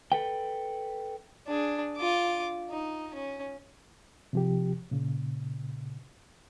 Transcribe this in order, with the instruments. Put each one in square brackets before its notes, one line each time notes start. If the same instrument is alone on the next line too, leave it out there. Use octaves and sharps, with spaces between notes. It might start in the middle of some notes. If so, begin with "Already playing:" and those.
[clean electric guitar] A4 B4 G5
[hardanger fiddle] D4 G#4
F4 D6
D#4
C#4
[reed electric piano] C3 F3 G4
A#2 C#3